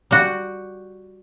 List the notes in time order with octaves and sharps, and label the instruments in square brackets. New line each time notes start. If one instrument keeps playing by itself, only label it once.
[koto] G3 F#4